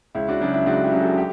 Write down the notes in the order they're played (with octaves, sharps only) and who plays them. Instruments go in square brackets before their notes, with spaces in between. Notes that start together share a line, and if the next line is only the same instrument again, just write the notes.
[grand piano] C#2 E4
D4 F#4
C#3 F#3 D4
E4
C#2 D4 F#4
E4 G4
C#3 F#3
F#4 A4
G4